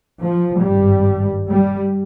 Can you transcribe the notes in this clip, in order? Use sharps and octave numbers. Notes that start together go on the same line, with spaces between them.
F3
G#1 G2 G3
G3